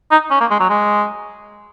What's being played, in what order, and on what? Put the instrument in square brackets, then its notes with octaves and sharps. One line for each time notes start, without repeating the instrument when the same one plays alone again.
[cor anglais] D#4
C#4
A#3
G#3
F#3
G#3